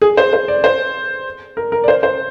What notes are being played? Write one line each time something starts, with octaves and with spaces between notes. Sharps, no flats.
G#4
C5
C5
D5
C5
A#4
A#4
D5
C5
C5